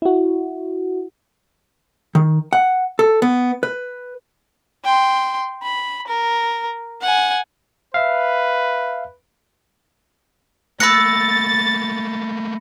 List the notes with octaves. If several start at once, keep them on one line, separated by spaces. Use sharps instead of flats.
E4 F#4
D#3
F#5
A4
B3
B4
G5 C6
B5
A#4
F#5 G#5
B4 E5 F5
A3 A#3 B5 E6 F#6 A6 A#6 C#7